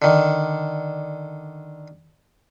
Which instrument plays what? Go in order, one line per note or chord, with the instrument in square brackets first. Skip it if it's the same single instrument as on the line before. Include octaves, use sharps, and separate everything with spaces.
[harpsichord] D3 D#3